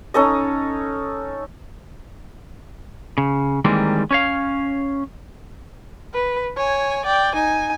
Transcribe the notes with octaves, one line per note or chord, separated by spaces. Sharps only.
C#4 D#4 A4 D#5
C#3
D#3 E3 G3 G#3 A#3 C4
C#4 C#5 F5
B4
C#5 G#5
D5 G5
D#4 G#5